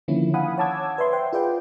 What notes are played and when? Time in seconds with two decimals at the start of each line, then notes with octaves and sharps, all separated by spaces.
0.08 D3 D#3 F3 A#3 C#4 E4
0.34 F5 F#5 G#5 B5 D#6
0.58 C#5 F#5 A5 D6 E6 G#6
0.98 B4 D5 E5 C6
1.13 C5 F#5 G5
1.33 F4 G#4 B4 D5 G5